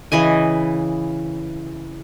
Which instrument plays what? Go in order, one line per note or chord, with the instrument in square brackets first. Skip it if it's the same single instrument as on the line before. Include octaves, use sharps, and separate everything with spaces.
[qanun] C#3 E3 D#5 G#5